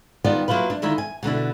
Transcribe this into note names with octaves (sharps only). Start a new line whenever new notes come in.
D#3 G3 B3 F4 D5
F#3 A#3 E4 F4 B4
D4
D3 D#3 E4 F4
G#5
B2 D3 D4 E4